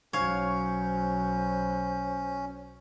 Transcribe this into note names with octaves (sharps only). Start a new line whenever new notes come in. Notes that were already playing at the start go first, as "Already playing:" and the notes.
B1 F#3 C#4 C5 C#5 F5